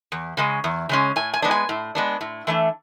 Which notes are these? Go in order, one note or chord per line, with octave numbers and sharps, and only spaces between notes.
E2
C#3 G#3 C#4
E2
C#3 G#3 C#4
A2 G#5
G#5
G#3 B3 D4
G#5
A2
G#3 B3 D4
A2
E3 A3 D4